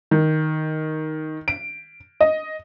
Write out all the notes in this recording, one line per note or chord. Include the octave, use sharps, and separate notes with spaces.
D#3
D7
D#5